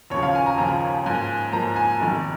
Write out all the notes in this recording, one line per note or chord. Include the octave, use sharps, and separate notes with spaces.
D#2 C#3 F3 C#5
F5
G#5
A#5
D#2 C#3 F3 A#5
G#2 F3 A#3 G#5
G#2 F3 A#3 A#5
G#5
F1 F2 D#3